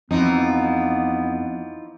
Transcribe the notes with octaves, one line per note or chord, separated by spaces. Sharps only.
F2 E3 F3 B3 D#4